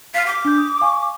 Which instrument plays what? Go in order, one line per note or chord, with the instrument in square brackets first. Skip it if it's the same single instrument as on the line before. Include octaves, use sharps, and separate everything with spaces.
[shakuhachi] F5 [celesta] F6 B6
[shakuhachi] D6
[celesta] D4 G6
D#6
F5 G#5 C#6